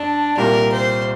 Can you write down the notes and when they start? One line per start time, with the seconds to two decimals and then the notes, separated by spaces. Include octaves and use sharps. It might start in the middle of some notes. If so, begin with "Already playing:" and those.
Already playing: G2 D4
0.37 C2 A#2 G3 A#3 A#4
0.72 C5